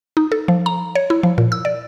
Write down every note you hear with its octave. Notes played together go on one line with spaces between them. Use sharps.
D#4
A4
F3
A#5
C#5
E4
F3
A#2
E6
D5